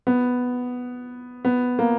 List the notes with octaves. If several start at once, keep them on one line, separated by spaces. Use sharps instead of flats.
B3
B3
A#3